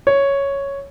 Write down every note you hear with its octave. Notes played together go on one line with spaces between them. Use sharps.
C#5